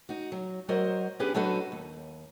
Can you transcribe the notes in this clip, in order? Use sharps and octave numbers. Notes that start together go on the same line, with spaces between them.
D#4 F#4
F#3
F#3 F#4 A#4 C5 D#5
B3 C#4 D4 G4 G#4 B4
F#3 D4 D#4 F#4 A4 B4
D#2